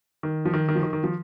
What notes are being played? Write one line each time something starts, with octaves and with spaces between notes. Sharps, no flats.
D#3
F3
D#3
D#3
F3
D#3
D#3
F3